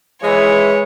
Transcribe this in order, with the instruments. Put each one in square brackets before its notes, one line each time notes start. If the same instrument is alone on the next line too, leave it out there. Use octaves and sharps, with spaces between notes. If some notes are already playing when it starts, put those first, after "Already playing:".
[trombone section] E3 [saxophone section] G#3 [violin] C#5